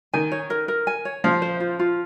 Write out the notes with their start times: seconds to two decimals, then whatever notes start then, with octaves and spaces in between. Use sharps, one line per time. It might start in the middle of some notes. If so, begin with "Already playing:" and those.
0.13 D#3 G#5
0.32 C#5
0.50 A#4
0.68 A#4
0.87 G#5
1.05 C#5
1.24 F3 F5
1.42 C5
1.60 F4
1.79 F4